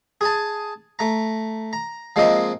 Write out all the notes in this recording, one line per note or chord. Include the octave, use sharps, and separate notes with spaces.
G#4 G#5 A5
A3 A#5
A#5
F3 G#3 A#3 C4 F4 D#5